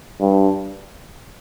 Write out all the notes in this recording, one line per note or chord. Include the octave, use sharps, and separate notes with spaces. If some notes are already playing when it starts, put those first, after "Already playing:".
G2